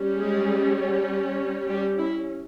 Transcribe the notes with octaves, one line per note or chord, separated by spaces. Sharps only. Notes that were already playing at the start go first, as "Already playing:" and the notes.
Already playing: G3 C#4
G#3 G#4
G3 G4
E4